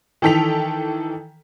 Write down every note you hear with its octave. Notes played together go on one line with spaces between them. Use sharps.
D#3 E3 A4 G5 B6 F7